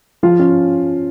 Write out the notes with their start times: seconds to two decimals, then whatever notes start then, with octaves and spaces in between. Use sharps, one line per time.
0.23 F3 F4 F5
0.39 C#4